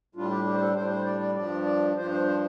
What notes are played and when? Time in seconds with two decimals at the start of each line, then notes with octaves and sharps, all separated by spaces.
0.15 A2 G3 D4 F4
0.30 G4
0.45 G4
0.54 C5
0.60 A4
0.75 A2 G3 D4 C5
0.91 C5
1.06 D5
1.21 D5
1.36 G2 F3 D4 D5
1.66 D5
1.96 G2 F3 D4 C5
2.12 C5
2.27 C5